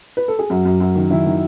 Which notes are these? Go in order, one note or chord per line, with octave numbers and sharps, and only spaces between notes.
B4
A4
G#4
F#2 F#4
F#2
F#2 F#4
D#3
D#3 E4
D#3